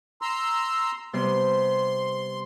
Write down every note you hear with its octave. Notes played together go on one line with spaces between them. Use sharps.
A#5 C6 E6
C3 G3 B3 C6